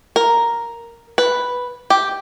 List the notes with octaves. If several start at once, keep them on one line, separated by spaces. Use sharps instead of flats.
A#4
B4
G4